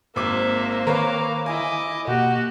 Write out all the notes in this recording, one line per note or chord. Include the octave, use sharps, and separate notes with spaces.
G#1 A#3 C5 E5 D6
D#3 A#4 B4 C#5 F5 D6
E4 D#5 G#5 D6
B2 A#3 F#4 G4